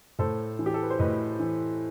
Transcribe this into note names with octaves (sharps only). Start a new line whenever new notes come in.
A2 A4 C5
E3
G4
A4
B4
C5
A2 B4 D#5
E3